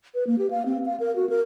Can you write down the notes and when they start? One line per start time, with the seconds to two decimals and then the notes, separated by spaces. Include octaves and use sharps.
0.14 B4
0.27 A#3
0.38 G4
0.51 F5
0.66 C4
0.86 F5
1.00 A#4
1.16 F#4
1.29 A#4